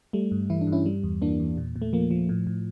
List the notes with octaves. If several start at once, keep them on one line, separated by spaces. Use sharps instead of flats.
G3 A3
G2
E3 E4
D4
G2
C#4 E4
G3
E2
E3 A#3 D4
E2
A#2
A#2
A3
F3 A#3
F3
A2
A2